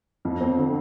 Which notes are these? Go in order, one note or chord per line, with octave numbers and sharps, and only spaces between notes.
F2
C4
D3